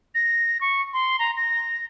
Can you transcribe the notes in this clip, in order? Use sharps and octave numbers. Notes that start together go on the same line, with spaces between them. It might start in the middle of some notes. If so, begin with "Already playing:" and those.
A#6
C#6
C6
A#5
A#6